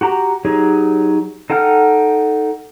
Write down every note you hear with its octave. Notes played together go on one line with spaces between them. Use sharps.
F#4 G4 A#5
F#3 D#4 G4 G#4 C#5
D#4 A4 F#5 G5 F6